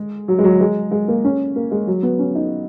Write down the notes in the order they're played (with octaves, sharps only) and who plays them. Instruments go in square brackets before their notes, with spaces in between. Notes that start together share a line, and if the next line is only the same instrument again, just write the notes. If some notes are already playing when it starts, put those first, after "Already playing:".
Already playing: [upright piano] G#3
F#3
G#3
F#3
G#3
G#3
A#3
C#4
A#3
G#3
F#3
B3
C#4
D#4